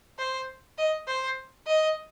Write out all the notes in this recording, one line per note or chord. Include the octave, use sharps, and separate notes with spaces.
C5
D#5
C5
D#5